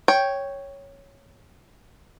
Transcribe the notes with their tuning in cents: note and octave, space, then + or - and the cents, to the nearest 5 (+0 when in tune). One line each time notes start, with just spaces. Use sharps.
C#5 +0 G5 +0